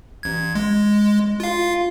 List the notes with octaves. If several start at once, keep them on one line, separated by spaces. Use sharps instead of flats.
A1 G#6
G#3
F4 F5